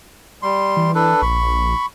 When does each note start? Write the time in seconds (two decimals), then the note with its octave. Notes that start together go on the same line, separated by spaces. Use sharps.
0.43 G3 C6
0.77 E3
0.95 D4 A4 B4
1.22 A#1 B5 C#6